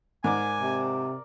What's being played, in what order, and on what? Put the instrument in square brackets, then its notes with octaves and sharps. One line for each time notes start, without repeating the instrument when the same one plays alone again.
[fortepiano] G#2 [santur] A#4 D5 D6 [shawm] G#5
[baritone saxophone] C3